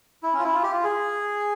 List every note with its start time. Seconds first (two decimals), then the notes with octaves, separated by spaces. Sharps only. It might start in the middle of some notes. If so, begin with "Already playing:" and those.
0.23 E4
0.33 C#4
0.39 F4
0.44 E4
0.54 F4
0.63 G4
0.72 F4
0.84 G#4